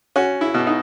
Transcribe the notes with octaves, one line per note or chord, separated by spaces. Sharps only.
C#4 F#4
E4
B2
D#4